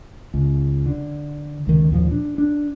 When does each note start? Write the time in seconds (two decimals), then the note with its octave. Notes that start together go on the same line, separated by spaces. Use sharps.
0.34 C#2
0.86 D3
1.67 C#2 D#3
1.91 D#2 A#2 F3
2.11 D4
2.38 D4